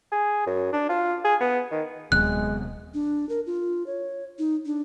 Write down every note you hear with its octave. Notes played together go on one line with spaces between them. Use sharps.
G#4
F#2
D4
F4
G#4
B3
D#3
D#1 C3 F#3 G#3 B3 F#6
D4
A#4
F4
C#5
D#4
D4